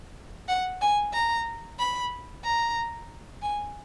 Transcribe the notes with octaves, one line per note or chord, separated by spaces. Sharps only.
F#5
G#5
A#5
B5
A#5
G#5